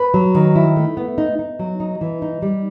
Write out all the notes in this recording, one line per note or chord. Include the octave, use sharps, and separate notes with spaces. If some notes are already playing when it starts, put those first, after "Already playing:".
Already playing: B4
F#3
D#3
E4
A3
B3
D#4
D#4
F#3
D#4
E3
D#4
G3